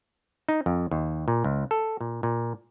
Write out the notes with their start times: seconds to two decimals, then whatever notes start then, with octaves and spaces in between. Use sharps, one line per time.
0.48 D#4
0.66 F2
0.91 D#2
1.28 A#2
1.44 C#2
1.71 A4
2.01 A#2
2.23 A#2